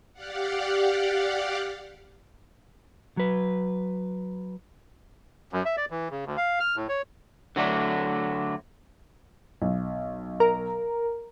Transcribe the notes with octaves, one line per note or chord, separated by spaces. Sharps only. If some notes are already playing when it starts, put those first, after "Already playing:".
G4 D5 F5 F#5
F#3 B4
F#2
E5
D5
E3
C#3
D2
F5
F6
A2
C#5
D3 F#3 A3 D4
B1
A#4